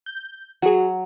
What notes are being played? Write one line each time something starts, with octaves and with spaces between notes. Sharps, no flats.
G6
F#3 F#4 G#4